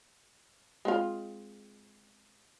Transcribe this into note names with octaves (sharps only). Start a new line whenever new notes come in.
G#3 C4 F4